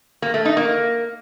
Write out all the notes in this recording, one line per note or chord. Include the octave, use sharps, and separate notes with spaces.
A#3
A3
D#4
A#3